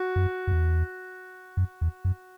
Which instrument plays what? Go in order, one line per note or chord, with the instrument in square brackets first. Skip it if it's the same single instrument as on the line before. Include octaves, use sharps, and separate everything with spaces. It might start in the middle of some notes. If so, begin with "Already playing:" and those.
Already playing: [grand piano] F#4
[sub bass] F#2
F#2
E2
F#2
E2
F#2